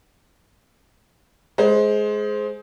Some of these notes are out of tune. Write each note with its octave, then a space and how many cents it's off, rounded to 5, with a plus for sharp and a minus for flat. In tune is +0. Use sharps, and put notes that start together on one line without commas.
G#3 +20 C5 +0